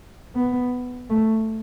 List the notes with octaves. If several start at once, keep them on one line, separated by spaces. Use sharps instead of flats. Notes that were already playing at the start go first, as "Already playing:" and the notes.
B3
A3